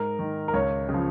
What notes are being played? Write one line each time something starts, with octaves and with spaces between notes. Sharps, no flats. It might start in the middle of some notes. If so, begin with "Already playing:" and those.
Already playing: G#2 A#4
D#3
A#4
C#2 C#5
C#3
F3